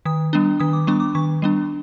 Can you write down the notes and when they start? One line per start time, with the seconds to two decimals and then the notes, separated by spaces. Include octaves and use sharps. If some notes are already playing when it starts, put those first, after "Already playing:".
0.05 D#3 D#6
0.33 G3 B3 D4
0.60 D#3 D#6
0.73 D6
0.87 G3 B3 D4 C#6
1.00 D6
1.15 D#3 C#6
1.42 G3 B3 D4